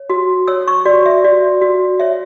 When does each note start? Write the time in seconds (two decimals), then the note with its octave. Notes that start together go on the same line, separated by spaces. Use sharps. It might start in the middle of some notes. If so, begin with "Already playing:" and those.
Already playing: C#5
0.10 F#4
0.47 C#5 E6
0.68 C#6
0.85 F#4 D5
1.06 E5
1.24 F#4 D5
1.62 F#4
2.00 C#5 E5